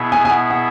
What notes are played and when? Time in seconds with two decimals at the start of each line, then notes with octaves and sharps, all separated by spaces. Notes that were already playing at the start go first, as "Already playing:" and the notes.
Already playing: B2 B3 E4 G#4 E5
0.12 G#5
0.25 G#5
0.31 F#5
0.50 F#5